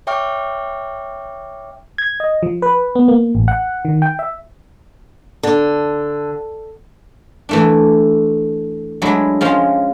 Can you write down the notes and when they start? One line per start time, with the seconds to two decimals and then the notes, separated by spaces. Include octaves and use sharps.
0.07 C#5 E5 G5 C#6 D6 F6
1.98 G#6
2.20 D#5
2.43 F3
2.62 B4
2.95 B3
3.08 A#3
3.35 A1
3.48 F#5
3.85 D#3
4.02 G5
4.19 E5
5.43 D3
7.49 E3 A3 D4
9.02 F#3 G#3 D4 E4 G#4
9.41 F3 G#3 C#4 F4